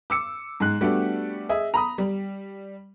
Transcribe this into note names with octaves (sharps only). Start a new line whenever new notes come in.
D6 E6 C#7
G#2 G#3 F#6
G3 A3 B3 D4 F#4 G4
G#4 D#5 E5
A#5 B5 D#6
G3